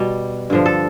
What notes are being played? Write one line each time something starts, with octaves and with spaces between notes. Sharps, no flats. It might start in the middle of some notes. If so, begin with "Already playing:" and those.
Already playing: B2 G3
G2 D3 F3
A4